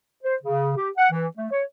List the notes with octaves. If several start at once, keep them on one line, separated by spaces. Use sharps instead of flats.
C5
C#3
G4
F#5
E3
A3
C#5